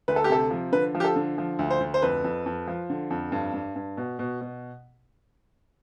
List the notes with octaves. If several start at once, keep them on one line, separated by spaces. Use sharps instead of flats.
D2 B4
A4
G4
C3 A4
F3
D3 B4
F3
G4
A4
D3
F3
D2
C5
D2
C5
F2 B4
F2
F2
F3
D3
F2
G2
G2
G2
B2
B2
B2